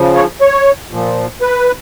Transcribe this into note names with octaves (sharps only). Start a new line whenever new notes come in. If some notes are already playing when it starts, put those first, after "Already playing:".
Already playing: C#3 F3
C#5
C#5
A#2 F3
B4